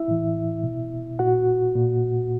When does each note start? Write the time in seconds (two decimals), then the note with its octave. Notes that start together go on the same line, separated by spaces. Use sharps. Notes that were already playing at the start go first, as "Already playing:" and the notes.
Already playing: E4 E5
0.08 A2 E3
0.64 B2
1.19 A#2 F#4 F#5
1.75 A#2